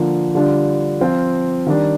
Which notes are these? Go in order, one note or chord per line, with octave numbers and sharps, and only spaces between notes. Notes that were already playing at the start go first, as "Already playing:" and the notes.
Already playing: D3 F3 A#3
D3 G3 D4 F4
F3 C4 F4
D#3 G3 D4